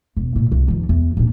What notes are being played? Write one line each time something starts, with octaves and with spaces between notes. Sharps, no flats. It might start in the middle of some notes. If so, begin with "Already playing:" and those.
E1
A#2 E4
C2
F2 D#3
E2
A#2 D4